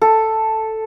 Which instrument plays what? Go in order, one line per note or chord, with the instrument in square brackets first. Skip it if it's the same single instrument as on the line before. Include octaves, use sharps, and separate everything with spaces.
[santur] A4